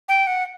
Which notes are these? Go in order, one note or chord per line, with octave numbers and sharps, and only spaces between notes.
G5
F#5